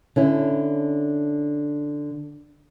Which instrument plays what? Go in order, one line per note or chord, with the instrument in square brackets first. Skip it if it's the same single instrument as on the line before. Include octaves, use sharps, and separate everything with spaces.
[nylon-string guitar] D3 C#4 E4